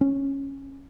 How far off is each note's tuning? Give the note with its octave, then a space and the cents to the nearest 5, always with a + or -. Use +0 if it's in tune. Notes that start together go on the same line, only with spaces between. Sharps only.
C#4 -10